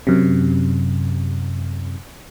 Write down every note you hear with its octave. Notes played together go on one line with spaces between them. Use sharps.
F#2 C3